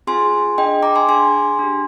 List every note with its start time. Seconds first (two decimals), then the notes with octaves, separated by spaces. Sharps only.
0.07 C4 F4 G#4 G#5 C6
0.58 D4 G#4 D#5 G5
0.82 A#5 D6
0.95 G#5 C6
1.08 D4 G#4 G#5 C6
1.59 D4 G4